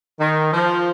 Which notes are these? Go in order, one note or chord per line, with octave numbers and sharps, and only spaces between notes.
D#3
F3